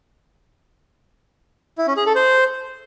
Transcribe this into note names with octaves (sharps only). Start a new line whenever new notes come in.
E4
C#4
G#4
A4
C5